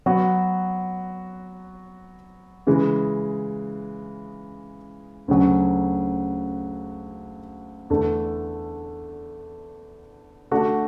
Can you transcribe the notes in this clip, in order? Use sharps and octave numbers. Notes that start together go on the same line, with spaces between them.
F#3 B3 F#4
C#3 E3 G#3
D2 C#3 F#3 C#4
E2 D3 A3
D3 A3 D4 F#4